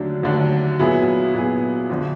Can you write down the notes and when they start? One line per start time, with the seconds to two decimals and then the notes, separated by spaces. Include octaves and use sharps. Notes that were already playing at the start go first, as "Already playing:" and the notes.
Already playing: D#2 D3 F#3 A3 D4
0.23 D#2 D3 F#3 A3 D4
0.79 A#2 F#3 B3 E4 G#4
1.34 A#2 F#3 B3 E4 G#4
1.89 F2 D3 F3